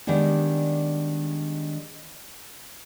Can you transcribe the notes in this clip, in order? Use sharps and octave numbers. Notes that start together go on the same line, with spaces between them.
D#3 G3 G#3 B3 D4